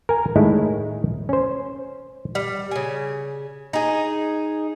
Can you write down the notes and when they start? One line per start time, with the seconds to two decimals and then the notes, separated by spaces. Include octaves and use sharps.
0.09 A#4 G#5
0.36 A2 D#3 G#3 E4
1.29 C#4 C5
2.35 G3
2.71 C#3 G#5
3.73 D#4 G#4